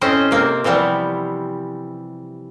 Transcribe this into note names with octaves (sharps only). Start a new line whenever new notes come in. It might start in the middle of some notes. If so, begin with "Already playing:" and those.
A2 C4 C#4 C5 D#5
C3 A#3 C4
C3 E3 F3 G3 B3